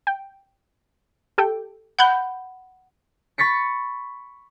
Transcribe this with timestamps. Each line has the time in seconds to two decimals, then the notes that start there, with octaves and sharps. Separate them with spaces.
0.07 G5
1.38 G4 A4 G5
1.99 F#5 B5 F#6 G6
3.38 B5 C#6 A6 B6 C#7